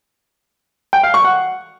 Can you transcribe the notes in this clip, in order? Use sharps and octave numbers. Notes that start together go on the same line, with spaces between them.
G5
F5
C#6
F#5